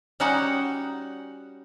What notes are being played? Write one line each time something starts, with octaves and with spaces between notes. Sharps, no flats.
G3 C#4 D#4 F#4 F#5